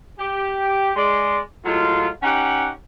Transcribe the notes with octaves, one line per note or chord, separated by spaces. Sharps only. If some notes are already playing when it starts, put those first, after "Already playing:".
G4
G#3 D5 C6
A2 F#3 G#3 F4
C#4 D#4 G4 F#5